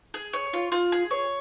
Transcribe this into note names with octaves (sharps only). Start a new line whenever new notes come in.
G#4
C#5
F4
F4
G#4
C#5